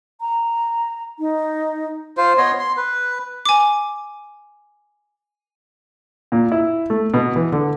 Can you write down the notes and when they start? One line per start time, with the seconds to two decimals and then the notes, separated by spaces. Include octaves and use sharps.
0.21 A#5
1.19 D#4
2.17 F4 C5
2.38 B3 C#5 D#5 C6
2.59 C6
2.77 B4
3.46 G#5 D6
6.32 A#2
6.52 E4
6.90 A3
7.14 B2
7.36 E3
7.52 D3